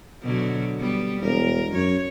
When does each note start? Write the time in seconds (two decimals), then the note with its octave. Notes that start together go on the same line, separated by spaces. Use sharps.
0.22 B2 D3 F#3
0.78 G3 B3
1.21 E1 A#4
1.72 F#2 C#5